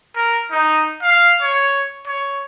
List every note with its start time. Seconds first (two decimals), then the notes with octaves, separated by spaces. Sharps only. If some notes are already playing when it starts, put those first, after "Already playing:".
0.16 A#4
0.51 D#4
1.02 F5
1.41 C#5
2.07 C#5